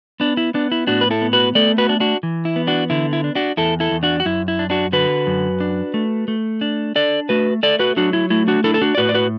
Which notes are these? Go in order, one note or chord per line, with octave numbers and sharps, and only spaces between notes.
B3 D4
E4
B3 D4
E4
A2 D4 F#4
B4
E4 A4
B3
F#4 B4
A3 A4 D5
F#4 B4
D4
D4 F#4
E3
E4
B3
D4 F#4
D3 E4
E4
D4
D4 F#4
E2 E4 A4
E4 A4
E2
D4 F#4
F#4
F#2 E4
E4
D4
D4 F#4
D3 F#4 B4
F#2
D4
A3
A3
D4
D4 A4 D5
A3 F#4 B4
A3 A4 D5
F#4 B4
F#3 D4 F#4
E4
A3 E4
D4 F#4
D4 E4 A4
A4
D4 F#4
D5
A2 F#4 B4
D5
F#4 B4